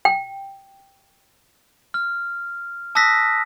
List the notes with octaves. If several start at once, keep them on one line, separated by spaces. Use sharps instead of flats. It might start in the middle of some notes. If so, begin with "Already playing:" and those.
G5
F6
A5 D#6 E6 F#6 A#6 B6